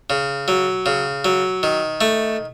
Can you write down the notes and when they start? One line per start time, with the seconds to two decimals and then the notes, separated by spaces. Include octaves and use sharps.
0.10 C#3
0.48 F#3
0.86 C#3
1.25 F#3
1.63 D#3
2.01 A3